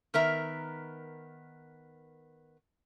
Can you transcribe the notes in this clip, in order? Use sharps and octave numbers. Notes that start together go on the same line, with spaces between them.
D#3 B3 A#4 E5 A#5